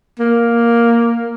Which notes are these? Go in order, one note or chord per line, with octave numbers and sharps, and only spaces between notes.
A#3